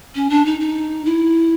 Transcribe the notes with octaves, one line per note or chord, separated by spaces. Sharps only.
C#4
D4
D#4
D#4
E4